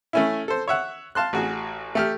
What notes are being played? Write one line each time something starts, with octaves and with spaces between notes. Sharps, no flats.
A3 C#4 E4
A4 C5
C#5 E5 F#5
F5 A5 C6 F#6
A1 F#4 G#4
A3 G4 F6